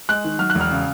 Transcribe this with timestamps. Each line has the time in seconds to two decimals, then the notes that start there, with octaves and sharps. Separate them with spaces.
0.09 G#3 F#6
0.24 D#3
0.39 F#3 F6
0.50 F#6
0.55 E1
0.61 F6
0.71 C#3